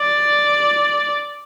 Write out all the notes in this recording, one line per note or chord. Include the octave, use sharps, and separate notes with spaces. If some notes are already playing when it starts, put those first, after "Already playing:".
Already playing: D5